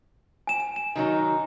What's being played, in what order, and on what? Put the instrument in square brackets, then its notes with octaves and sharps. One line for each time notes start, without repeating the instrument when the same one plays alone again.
[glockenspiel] G#5 E7
E7
E7
[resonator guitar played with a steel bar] D#3 F#3 D#4